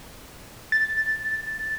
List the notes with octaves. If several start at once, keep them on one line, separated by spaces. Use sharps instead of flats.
A6